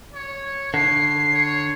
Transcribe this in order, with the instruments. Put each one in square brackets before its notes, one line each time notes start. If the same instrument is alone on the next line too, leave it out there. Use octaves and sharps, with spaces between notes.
[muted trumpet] C#5
[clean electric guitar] D3 [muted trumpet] C#5 [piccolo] C7
[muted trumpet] C#5